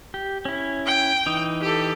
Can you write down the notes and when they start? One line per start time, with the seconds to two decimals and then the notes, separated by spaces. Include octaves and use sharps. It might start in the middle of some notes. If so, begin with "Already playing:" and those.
0.14 G4
0.45 C#4 E4
0.86 G5
1.26 E3 D#4
1.61 G4 A4